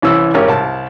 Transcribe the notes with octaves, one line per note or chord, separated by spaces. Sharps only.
C2 E3 C#4 E6
G#1 C#4 G4 A#4
C2 A5